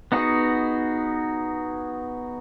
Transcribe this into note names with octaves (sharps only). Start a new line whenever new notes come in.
B3 D#4 F#4 G#4